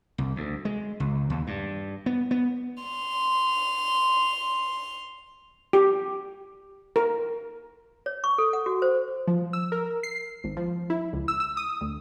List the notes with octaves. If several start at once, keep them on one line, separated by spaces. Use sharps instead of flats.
C2
D2
G#3
C#2
D#2
G2
B3
B3
C6 F7
G4
A#4
C#5
C#6
A4
F#5
F#4
C5
F3
E6
A#4
C7
G#1
F3
E4
C#2
E6
E6
D#6
D2